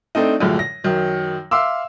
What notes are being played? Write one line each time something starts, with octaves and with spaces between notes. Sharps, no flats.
A3 C4 D4 D#4
F#2 A2 D3 F3 G#3
A#6
F#2 D#3 F#3
E5 F5 C6 D6 E6